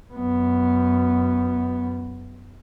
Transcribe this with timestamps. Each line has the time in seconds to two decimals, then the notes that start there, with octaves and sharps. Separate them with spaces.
0.13 F#2 B3